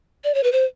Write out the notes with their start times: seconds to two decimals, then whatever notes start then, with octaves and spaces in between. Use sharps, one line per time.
0.24 D5
0.34 C#5
0.43 B4
0.52 C5